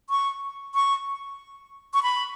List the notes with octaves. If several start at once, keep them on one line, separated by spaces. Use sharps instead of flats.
C#6
C#6
C#6
B5